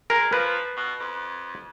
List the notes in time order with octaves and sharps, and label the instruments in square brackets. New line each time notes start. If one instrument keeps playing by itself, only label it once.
[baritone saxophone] G#3 [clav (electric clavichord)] A#4
[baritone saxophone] F3 [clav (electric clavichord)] B4
[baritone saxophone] B2
F2